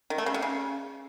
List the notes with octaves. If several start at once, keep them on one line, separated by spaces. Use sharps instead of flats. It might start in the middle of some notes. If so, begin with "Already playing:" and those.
D#3
A3
C#3
C3
C#3